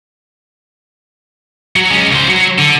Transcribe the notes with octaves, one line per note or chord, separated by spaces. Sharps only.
F#3
G#3 C#4
C#2 C5
F#3
D3